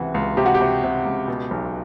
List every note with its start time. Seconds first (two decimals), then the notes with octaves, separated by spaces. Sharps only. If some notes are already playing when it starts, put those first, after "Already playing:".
Already playing: C#2 C3 E3 F#4
0.14 C#2
0.37 C3 G4
0.46 F#4
0.54 G4
0.61 C3
0.83 C3
1.05 C#2
1.28 B2
1.51 B1